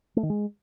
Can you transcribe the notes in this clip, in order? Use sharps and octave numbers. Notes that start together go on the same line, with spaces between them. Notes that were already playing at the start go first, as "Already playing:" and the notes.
A3
D#3
G#3